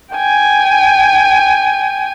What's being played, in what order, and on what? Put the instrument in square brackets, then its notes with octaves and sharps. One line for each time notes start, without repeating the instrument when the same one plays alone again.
[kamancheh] G5 G#5